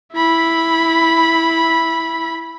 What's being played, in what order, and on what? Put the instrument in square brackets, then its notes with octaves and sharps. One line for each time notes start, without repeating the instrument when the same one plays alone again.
[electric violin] E4 B5